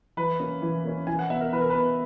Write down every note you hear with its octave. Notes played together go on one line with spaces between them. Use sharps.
E3 B4
A#3 C#4
E3
A#3 C#4
E3 G#5
F#5
B3 E5
A#4
E3 B4
A#4
B3 B4